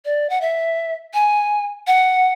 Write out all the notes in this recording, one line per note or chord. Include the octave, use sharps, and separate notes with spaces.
D5
F#5
E5
G#5
F#5